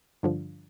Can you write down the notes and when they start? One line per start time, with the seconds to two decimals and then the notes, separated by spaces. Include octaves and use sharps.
0.23 G2 D3 F3